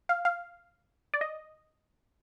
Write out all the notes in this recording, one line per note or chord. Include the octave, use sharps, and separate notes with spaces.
F5
F5
D5
D#5